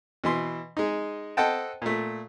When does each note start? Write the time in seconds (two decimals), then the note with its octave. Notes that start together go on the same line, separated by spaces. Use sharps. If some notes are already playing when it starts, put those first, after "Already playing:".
0.24 B2 E3 C6
0.77 G#3 D#4
1.37 A4 C5 D#5 F#5 G5 A5
1.82 A#2 A3